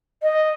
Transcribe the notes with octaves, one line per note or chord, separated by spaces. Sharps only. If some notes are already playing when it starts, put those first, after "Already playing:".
D#5